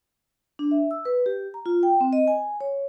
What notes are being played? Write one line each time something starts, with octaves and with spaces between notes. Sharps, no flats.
D4
E5
E6
B4
G4
A#5
F4
G5
C4
D#5
G#5
C#5